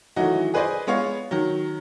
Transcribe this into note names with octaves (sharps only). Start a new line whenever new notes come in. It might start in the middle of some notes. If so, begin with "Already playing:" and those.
D#3 E3 F#3 A3 F#4 D#5
G#4 B4 C5 D5 D#5 G#5
G#3 B3 C#5 F5
D#3 F#3